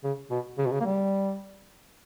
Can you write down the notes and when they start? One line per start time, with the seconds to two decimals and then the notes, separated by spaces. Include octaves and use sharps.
0.04 C#3
0.31 B2
0.58 C#3
0.66 B2
0.72 C#3
0.81 A#3
0.85 G3